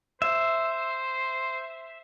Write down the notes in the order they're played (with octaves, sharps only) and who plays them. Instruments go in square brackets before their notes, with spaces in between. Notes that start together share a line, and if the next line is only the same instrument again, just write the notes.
[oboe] C5 [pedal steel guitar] E5